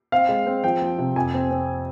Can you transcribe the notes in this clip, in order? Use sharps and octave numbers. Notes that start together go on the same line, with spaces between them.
C4 F5
G#3
C4
F3 G5
F3
C3
F2 G#5
C4
C4